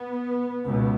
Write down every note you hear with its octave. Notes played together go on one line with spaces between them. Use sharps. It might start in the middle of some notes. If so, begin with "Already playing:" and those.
Already playing: B3
C#2 B2